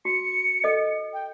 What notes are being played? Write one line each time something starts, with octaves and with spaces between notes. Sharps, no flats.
F#4 C#7
A4 D#5
G5